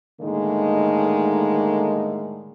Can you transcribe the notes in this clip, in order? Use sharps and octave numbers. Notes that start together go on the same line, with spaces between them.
A2 D3 D#3 G#3 A#3 D#4